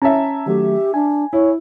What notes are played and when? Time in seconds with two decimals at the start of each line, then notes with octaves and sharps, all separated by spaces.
0.02 C#4 E5 A5 A#5
0.46 D#3 F#3 A3 G4
0.94 D4 G#5
1.33 E4 C#5